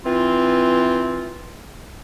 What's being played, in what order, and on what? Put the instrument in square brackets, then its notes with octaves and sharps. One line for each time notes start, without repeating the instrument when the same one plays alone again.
[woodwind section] E3 C4 F4